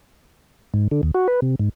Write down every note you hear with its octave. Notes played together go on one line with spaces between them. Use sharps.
G#2
D3
D#2
F#4
B4
C3
G#2